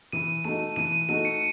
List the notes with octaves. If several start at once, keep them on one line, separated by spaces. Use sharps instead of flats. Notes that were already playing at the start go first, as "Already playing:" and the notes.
E3 D#7
A3 D#4 F#4 D#7
E3 D#7
D#7
A3 D#4 F#4 D#7
C#7